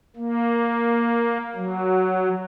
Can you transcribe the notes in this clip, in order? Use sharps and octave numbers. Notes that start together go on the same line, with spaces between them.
A#3
F#3